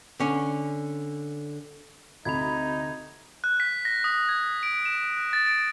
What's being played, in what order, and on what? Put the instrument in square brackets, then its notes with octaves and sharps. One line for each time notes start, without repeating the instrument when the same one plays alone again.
[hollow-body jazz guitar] D3 C#4
[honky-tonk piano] D2 C3 B5 [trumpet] D#4 [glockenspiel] G#6 F7
[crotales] F#6
B6
A#6
D#6
G#6
D7
E7
F#6
A6
D7